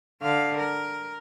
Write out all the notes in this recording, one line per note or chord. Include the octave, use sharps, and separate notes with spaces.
D3 F5
A#4